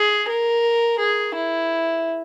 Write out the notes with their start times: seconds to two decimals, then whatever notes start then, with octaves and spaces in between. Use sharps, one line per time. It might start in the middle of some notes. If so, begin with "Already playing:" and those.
Already playing: G#4
0.29 A#4
0.99 G#4
1.35 E4